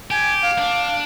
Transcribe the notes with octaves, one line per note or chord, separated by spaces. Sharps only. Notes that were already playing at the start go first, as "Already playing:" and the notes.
G4 G#5
F5
D4